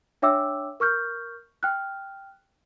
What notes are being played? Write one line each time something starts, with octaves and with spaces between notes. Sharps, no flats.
D4 C#5 E5 G5 D6 E6
A#4 C#6 F6 G6
G5 F6 F#6